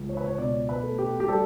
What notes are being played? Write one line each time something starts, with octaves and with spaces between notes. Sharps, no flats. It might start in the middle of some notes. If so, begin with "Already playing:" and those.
Already playing: C#2
C#5
B4
C#5
B2 D5
B4
A3
G4
G4
G3 A4